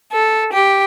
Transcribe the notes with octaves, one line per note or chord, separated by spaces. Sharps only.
A4
G4